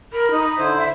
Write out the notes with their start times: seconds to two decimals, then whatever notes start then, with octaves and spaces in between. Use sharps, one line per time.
0.13 A#4 B5
0.31 D#4
0.58 D3 E4 C5
0.77 E5